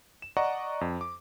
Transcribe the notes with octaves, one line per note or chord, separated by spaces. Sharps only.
E7
D5 D#5 F#5 A#5 C#6
F2
D6